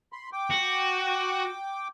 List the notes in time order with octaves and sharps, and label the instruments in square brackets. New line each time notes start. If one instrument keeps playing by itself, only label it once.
[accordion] B5 C6
G5 D6
[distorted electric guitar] F#4